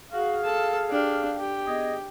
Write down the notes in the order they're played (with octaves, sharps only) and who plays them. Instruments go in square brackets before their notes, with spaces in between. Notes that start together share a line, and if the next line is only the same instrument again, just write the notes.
[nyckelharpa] F#4 [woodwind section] G#4 F5
[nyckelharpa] A4 A5
D4 G4
G4
[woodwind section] B3 G#4 D#5